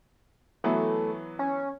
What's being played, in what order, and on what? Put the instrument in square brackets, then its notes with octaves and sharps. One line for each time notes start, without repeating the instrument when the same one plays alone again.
[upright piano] E3 F#3 B3 [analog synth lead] A3
[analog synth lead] C#4